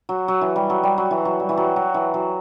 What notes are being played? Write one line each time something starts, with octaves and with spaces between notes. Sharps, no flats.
F#3
F#3
E3
G3
F#3
G3
F#3
E3
F#3
G3
E3
F#3
F#3
E3
F#3